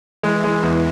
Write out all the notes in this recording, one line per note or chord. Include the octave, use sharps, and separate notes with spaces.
E3 G#3
G#3
E2